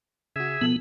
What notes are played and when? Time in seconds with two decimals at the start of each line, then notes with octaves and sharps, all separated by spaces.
0.36 C#3 F#4 G#4 E5
0.61 B2 F3 B3 A4